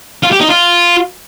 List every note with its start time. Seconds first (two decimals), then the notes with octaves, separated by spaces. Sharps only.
0.23 F4
0.32 G4
0.40 D#4
0.49 F4